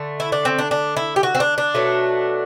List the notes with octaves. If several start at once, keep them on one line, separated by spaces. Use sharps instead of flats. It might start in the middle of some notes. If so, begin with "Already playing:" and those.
Already playing: D3 A3
E4
D4
C4
D4
D4
E4
G4
F#4
C4
D4
D4
B2 F#3 A3